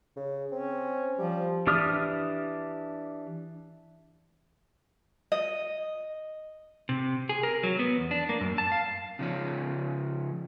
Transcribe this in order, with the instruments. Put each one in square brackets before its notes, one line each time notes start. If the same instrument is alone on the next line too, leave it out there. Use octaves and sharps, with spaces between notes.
[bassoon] C#3
[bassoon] C4 [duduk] C#4
[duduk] F3 [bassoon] G3
[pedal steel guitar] E3 D4 G4 D#6 F6
[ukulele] D#5
[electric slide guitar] C3
G#4
A#4
F#3
B3
E2
D4
A#3
F#2
A5
F5
C#3 F3 C#4